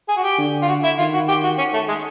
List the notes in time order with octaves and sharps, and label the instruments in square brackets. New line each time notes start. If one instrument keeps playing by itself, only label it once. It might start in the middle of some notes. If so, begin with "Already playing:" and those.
[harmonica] G#4
F#4
G4
[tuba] D3
[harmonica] F4
F#4
E4
[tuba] D#3 [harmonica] F4
[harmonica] F#4
G4
F#4
C#4
A3
G#3